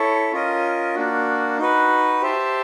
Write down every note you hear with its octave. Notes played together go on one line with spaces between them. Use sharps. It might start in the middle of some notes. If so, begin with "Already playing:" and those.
Already playing: E4 A4 C#5
C#4 F4 A#4 D#5
A#3 D4 F#4
D#4 F#4 B4
G4 C5 E5 A5